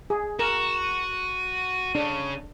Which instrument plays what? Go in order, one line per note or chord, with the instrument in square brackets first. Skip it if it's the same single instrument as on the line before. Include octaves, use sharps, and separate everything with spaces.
[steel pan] G#4
[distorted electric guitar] F#4 [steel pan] A#4 [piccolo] E7
[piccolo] D#7
[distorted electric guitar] C#3 [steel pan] D4